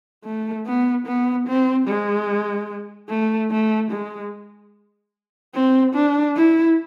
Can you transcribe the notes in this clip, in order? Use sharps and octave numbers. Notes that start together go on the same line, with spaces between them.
A3
B3
B3
C4
G#3
A3
A3
G#3
C4
D4
E4